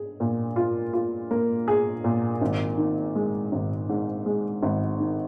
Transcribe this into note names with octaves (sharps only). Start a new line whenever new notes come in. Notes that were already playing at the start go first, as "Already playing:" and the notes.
Already playing: G#4
A#2
F4
F4
A#3
G#4
A#2
G#1
D#3
G#3
G#1
G#2
G#3
G#1
D#3